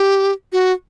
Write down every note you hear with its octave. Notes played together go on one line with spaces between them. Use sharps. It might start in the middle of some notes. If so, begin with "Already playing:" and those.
Already playing: G4
F#4